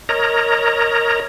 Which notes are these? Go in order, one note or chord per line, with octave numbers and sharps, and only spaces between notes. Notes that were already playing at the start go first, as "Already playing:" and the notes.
A#4 C#5 D#5 A#5